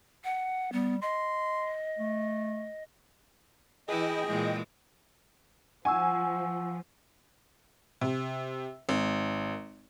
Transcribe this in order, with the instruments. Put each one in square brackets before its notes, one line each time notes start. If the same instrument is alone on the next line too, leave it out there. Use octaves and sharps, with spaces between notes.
[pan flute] F#5
[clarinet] G3 [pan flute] B3
[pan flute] D#5 [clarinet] C6
[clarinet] A3
[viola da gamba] E3 E4 B4 [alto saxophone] G#4 [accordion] D#5 G5
[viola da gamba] A#2 E3 G#3
[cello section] F3 [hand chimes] F#5 C#6 E6 [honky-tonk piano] G#5
[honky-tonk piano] C3
G#1